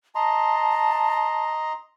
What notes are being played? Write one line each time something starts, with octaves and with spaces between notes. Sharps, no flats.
D#5 A5 A#5 C6